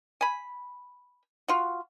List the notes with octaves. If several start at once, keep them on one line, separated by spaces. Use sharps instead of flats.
G#5 B5
F4 F#4